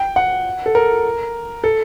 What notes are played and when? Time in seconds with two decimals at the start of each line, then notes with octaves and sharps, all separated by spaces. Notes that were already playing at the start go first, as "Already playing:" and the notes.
Already playing: G5
0.16 F#5
0.66 A4
0.75 A#4
1.64 A4